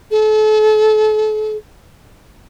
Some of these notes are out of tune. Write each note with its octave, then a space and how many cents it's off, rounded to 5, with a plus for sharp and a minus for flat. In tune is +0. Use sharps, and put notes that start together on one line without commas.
A4 -40